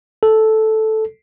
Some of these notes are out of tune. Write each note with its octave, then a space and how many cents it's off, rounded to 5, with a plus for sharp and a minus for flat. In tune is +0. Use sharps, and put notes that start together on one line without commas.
A4 -5